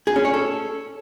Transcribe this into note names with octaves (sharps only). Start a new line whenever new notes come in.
G#4
C#4
C#5
A4